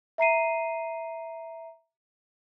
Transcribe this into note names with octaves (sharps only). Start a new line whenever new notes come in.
E5 A#5 C7 D#7